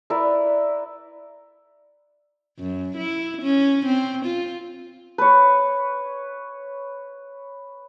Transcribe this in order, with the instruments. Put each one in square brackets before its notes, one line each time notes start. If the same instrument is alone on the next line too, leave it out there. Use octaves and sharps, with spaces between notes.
[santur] E4 A#4 B4 D5
[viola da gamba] F#2
E4
C#4
C4
F4
[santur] B4 C#5